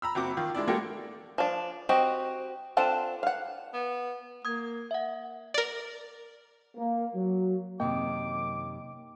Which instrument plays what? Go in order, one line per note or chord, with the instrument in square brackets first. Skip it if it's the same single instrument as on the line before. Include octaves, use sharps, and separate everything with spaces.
[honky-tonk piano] A#5 B5 E6
F#1 C4 F#4 D6
D#3 F4
G#3 D4 E4 D5
G#3 A#3 F#4 G4 A4
[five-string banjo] F3 D4
C4 F#4 G4 D#5
C4 D4 F4 A4 F#5
F5 F#5
[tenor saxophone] B3
[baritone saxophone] A#3 [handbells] D#6 G#6
[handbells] E5 F#5
[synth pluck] A#4 D5
[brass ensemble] A#3
F#3
[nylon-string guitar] F#2 C3 D#3 [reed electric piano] A#3 D#5 G5 [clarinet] D6